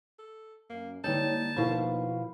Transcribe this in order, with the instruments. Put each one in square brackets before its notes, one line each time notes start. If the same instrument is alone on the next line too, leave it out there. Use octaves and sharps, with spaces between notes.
[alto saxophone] A4
[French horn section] F#2 [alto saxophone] A#3
[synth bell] D3 A#3 G6 [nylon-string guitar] G3 D#4 [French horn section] C#5 [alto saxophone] A5
[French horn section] D#2 D#4 [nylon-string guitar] B2 F3 [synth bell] E4 B5